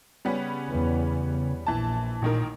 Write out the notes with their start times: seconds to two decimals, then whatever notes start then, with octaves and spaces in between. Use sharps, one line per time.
0.25 C#3 G3 B3 C#4
0.70 E2
1.67 A#1 E3 A5
2.22 A1 A#2 D#3 A#4